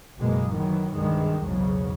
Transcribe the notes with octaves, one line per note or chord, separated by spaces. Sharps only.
F#1 B2 G#3 A#3
D#3 E3 F#3
C2 G2 D#3 E3 G#3
B1 E2 G#2 C#3 F#3